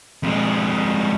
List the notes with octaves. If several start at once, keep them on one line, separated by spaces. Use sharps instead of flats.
F2 G#3